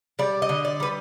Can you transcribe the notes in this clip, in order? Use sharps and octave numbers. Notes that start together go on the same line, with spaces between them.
G3 D5
D#5
D3
D5
G3 B4